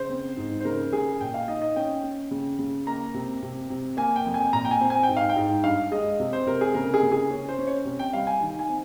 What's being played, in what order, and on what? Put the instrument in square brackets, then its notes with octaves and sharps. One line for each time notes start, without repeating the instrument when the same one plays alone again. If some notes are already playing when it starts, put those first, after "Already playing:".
Already playing: [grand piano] C#3 C5
C4
G#2
C5
C#3 A#4
C#3 G#4
A#2 G5
F5
D#4 D#5
D#5
C#4 G5
C#4
C#3
C#3
A#3 A#5
C3
C3
C3
A#3 G#5
G5
F2
G#5
A#2 A#5
G5
G#5
C4
G#5
G5
G#2
F5
G5
G#2
G2 F5
G#3 D#5
C3
C5
C3 A#4
G#4
C#3 A#4
G#4
C#3
G#4
C#4
C5
C#4
C#5
C3
G5
G3 F5
G#5
D#3
G#5
C4